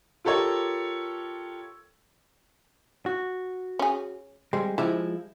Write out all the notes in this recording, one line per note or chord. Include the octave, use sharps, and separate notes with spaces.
F4 G4 A4 A#4 C#5
F#4
C#4 G#4
G3 G#3 C4
F3 G3 G#3 E4